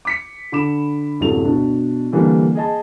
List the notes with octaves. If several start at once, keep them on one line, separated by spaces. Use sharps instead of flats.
D6 B6 C#7
D3 B5 D6 E7
D1 C#2 F#2 C3 A4 F7
B2 D4
D3 E3 G3 A#3 D4
G#4 D#5 A5